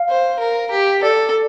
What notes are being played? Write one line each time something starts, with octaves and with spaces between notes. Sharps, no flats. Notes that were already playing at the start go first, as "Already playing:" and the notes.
Already playing: F5
C5
A#4
G4
A4 D5